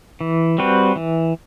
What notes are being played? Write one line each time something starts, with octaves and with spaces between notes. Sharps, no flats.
E3
G3 C4 F#4 B4
E3